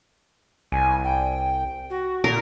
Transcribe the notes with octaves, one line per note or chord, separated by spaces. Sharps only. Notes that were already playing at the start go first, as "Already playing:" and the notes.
C2 G#5
G5
F#4
A#2 A#4